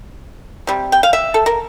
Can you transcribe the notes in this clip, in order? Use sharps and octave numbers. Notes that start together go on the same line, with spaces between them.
C3 G3
G5
F5
E5
A4
A#4